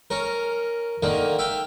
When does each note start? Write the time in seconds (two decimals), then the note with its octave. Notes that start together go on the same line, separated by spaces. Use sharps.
0.10 C#4 A#4
1.03 D3 D#3 A#3
1.39 E5 F5 G5